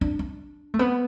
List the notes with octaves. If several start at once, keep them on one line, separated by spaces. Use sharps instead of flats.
D4
D4
A3
B3